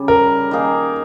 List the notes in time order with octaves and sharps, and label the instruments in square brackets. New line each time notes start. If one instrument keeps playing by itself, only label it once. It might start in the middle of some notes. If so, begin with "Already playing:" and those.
Already playing: [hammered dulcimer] C#3 G3
[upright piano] A#4
[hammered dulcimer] D#3 A#3 D#4 G#4